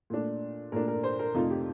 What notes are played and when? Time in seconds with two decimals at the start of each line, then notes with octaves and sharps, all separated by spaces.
0.10 A#2 A3 D4
0.72 A#2 A3 D4 A#4
0.88 A#4
1.04 C5
1.19 A#4
1.34 F2 C3 F3 A3 D#4 F4
1.50 G4